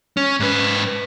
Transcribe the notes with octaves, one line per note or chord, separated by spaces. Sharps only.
C#4
G#2 B4